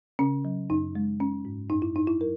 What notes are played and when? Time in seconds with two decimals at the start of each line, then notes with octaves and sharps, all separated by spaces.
0.19 C#3 C#4
0.45 F#3
0.70 F#2 D#4
0.95 G#3
1.20 G#3 C#4
1.45 G#2
1.70 F#2 D#4
1.82 E4
1.95 F#2 D#4
2.07 E4
2.20 F#3 A#4